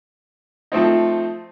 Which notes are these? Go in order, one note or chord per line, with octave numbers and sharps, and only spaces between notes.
F3 A3 C4 D#4